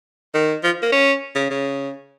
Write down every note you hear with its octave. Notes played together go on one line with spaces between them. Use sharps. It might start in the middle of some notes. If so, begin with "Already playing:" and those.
D#3
F3
A#3
C#4
C#3
C#3